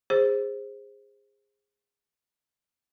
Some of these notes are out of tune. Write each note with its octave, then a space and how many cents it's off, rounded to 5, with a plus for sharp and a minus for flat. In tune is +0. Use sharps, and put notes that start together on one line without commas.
G#4 -20 C5 +10